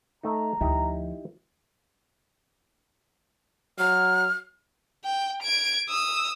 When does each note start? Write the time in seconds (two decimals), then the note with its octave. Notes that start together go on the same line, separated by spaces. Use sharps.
0.23 A3 D#4 A#5
0.61 D2 F3 D#4 E4 G4
3.78 F#3 F6
5.05 G5
5.42 G#6 D7
5.89 D#6 E6